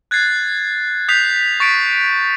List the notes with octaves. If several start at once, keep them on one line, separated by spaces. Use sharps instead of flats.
F#6 G#6 A6 C7
D#6 G6 B6 C7 F7
C#6 A6 B6 C#7 D7